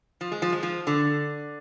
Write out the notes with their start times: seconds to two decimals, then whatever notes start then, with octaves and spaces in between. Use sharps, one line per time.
0.21 F3
0.32 G#3
0.42 F3
0.52 G#3
0.63 F3
0.87 D3